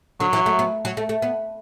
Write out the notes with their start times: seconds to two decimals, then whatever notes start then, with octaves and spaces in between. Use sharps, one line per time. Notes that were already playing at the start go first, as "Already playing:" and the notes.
0.20 D3 F#3
0.33 E3
0.46 A3
0.59 B3
0.85 F#3
0.97 A3
1.09 A3
1.22 B3